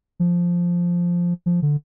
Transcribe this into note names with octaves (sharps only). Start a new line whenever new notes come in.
F3
F3
D3